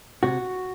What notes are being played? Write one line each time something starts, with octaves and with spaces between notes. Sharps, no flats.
C3 F#4